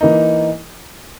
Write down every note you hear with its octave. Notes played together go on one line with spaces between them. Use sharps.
E3 A#3 D#4